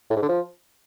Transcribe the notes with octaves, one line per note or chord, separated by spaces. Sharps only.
A2
G#2
D3
F3